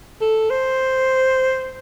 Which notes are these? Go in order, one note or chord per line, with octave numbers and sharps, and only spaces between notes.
A4
C5